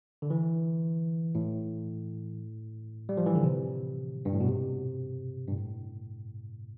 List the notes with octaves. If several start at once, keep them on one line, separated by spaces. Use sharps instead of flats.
D3
E3
A2
G3
F3
E3
D3
C3
G2
A2
B2
C3
G2
A2